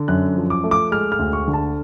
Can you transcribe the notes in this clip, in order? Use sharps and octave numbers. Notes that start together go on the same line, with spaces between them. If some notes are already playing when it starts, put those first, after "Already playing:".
Already playing: D3
F#2 F#6
F3
D6
A3
D6
G#3 F6
F6
D2
C#6
D3
A5